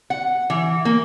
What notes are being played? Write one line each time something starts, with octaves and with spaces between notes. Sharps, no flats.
F#5
E3
A#3